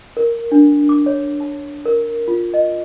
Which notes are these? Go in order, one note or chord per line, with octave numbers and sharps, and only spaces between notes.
A#4
D4
D6
C#5
A5
A#4
F4
D#5